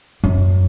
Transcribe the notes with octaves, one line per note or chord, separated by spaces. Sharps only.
F#2